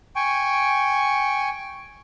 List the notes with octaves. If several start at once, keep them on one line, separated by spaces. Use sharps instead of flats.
G5 G#5 C#6